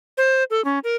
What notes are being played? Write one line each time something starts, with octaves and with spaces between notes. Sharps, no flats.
C5
A4
C#4
A#4